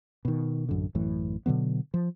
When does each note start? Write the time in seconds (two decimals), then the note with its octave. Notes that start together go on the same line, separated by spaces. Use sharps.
0.25 B2 D#3
0.69 A1 F#2 D3
0.95 A1 F#2 A2 E3
1.46 B2 D3 F#3 B3
1.94 F3